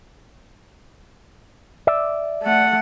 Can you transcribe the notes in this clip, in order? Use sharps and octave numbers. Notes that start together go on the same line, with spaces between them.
D5 E5
A3 F#5